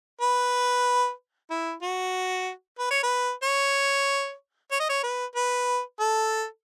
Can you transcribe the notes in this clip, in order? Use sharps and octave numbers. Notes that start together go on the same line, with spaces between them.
B4
E4
F#4
B4
C#5
B4
C#5
C#5
D#5
C#5
B4
B4
A4